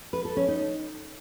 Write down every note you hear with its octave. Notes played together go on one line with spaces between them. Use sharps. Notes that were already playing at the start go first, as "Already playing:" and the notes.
B4
A4
C#4
D#4